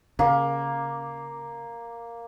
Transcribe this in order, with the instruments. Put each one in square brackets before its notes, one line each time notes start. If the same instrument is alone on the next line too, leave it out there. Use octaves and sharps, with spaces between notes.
[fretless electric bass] C#3 [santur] A#3